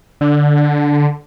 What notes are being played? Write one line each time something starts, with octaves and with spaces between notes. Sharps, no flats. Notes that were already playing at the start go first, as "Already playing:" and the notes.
D3